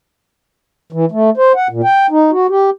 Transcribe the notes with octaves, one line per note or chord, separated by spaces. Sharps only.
E3
A3
C5
F#5
A#2
G5
D#4
F#4
G4